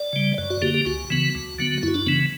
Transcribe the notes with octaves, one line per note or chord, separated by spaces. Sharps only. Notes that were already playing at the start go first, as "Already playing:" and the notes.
Already playing: D5
C#3 G3
F#2 D5
F#4
D3 A#3 G4
G4
C#2 F#4
C#3 E3 B3
D2
D3 F#3 B3
F#2 E4
D4
C#3 E3 B3